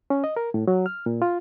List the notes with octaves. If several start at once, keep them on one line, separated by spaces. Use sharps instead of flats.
C#4
D#5
A#4
A2
F#3
F6
A#2
F4